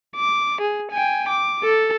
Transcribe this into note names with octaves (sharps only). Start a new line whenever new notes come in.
D6
G#4
G5 G#5
D6
A4